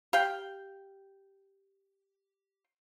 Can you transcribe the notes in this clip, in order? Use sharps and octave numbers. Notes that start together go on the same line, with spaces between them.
G4 F5 G5